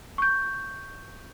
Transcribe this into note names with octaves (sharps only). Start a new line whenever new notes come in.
C#6 G6